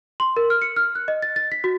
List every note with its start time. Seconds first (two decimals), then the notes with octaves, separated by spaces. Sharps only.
0.20 C6
0.37 A#4
0.50 F6
0.62 C#7
0.76 F6
0.95 F#6
1.08 D#5
1.22 A6
1.36 A6
1.52 B6
1.64 F#4